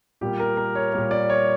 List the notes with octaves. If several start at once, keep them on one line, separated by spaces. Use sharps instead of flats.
A#2 G3 A#3 G4
A#4
A#4
C#5
A#2 G3 A#3
D5
C#5